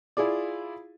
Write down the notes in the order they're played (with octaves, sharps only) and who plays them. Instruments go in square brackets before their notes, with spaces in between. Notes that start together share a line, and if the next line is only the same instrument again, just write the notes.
[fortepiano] E4 F4 G#4 D5